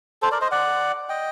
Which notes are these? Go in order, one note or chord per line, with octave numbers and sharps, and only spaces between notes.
A4 C5
A#4 D5
C5 D#5
D5 F#5
D#5 G5